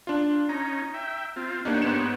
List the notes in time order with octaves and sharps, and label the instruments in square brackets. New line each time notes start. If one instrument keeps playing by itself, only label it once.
[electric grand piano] D4 F4
[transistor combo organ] C#4 D#4 [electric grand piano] A#5
[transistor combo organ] E5 G5
C4 F4
[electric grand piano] A#3 D4 D#4 [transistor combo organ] G4 C#5 F#5
[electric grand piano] G#2 B3 E7